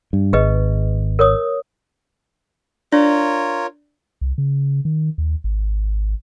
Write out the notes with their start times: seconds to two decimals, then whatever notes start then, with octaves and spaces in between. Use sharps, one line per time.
0.13 G2
0.33 G#1 G#4 B4 D#5
1.19 A#4 C#5 D#6
2.92 D4 F4 A#4 C#5 D5
4.21 C2
4.38 C#3
4.85 D#3
5.18 D#2
5.44 G#1